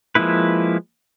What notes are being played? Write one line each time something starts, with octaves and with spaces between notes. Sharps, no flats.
F3 G#3 A#3 E4 B4